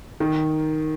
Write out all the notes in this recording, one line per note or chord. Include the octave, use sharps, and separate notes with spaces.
D#3